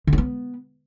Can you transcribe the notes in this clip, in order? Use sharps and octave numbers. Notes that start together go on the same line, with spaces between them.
D3
C#4
B3